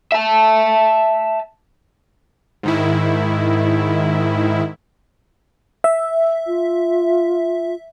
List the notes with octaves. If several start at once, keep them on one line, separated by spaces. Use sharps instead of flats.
E5 A5
G#2 D#3 E4
E5
F4